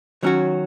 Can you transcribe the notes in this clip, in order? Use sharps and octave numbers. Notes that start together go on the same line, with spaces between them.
D#3 F#3 C#4 F#4